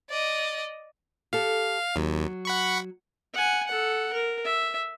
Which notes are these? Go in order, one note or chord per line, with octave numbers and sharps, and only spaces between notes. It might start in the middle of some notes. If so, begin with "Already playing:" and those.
D5 D#5
G4 A4 F5
D#2 F#3
F#5 B5 C#6
F#5 G#5
A4 F#5
A#4
E5